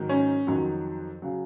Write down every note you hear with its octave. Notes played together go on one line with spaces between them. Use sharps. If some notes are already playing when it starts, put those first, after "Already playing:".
Already playing: G#2 D#3 F#3
C#4
F2 D#3 F#3
C#3 F#3